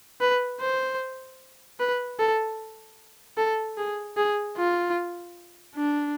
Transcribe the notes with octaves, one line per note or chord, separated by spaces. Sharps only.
B4
C5
B4
A4
A4
G#4
G#4
F4
D4